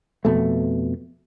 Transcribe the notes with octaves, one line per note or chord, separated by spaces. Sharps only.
F2 B2 A3